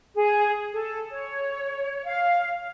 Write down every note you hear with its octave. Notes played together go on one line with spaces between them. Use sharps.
G#4
A4
C#5
F5